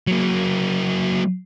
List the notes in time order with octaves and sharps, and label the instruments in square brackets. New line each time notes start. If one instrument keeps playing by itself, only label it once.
[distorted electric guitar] F#3 A#3